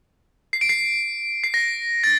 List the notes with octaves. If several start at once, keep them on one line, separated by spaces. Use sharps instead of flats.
C7
D7
C7
C7
A#6
A6